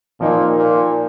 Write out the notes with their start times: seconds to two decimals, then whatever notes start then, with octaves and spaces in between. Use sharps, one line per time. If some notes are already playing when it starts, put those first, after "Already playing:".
0.21 A#2 F3 A#3 D#4
0.56 A#2